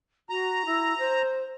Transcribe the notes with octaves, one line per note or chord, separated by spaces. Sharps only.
F#4 A#5
E4
C5